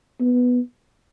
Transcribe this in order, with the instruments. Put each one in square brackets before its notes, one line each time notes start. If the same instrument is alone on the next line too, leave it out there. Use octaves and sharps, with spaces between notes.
[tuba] B3